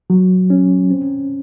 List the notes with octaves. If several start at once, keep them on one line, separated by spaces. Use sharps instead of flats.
F#3
C#4
C4